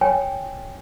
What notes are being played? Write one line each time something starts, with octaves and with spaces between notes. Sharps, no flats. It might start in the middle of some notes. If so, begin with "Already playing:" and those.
C#5 G5 G#5